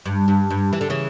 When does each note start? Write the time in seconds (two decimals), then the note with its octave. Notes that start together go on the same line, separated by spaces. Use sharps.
0.06 G2
0.28 G2
0.50 G2
0.73 E3
0.81 D3
0.90 C#3 E3